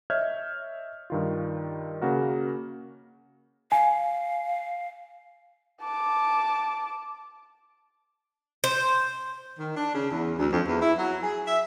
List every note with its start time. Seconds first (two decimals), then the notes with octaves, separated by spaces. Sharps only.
0.10 C#5 D#5 E5 F6 G6 G#6
1.10 G2 D#3 F4
2.01 C#3 A#3 F#4 A#4
3.72 F5 G#5
5.82 A5 D6
8.64 C5
9.59 D#3
9.76 D4
9.95 C#3
10.11 E2
10.39 D2
10.52 F2
10.67 E2
10.82 E4
10.98 F#3
11.23 G#4
11.47 E5